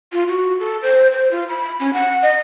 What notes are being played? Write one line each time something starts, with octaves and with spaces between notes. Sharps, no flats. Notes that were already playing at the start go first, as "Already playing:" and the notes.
F4
F#4
A4
C5
C5
F4
B5
C#4
F#5
D#5